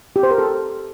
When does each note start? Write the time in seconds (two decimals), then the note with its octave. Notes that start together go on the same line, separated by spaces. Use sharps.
0.16 G4
0.23 C5
0.31 A#4
0.38 A4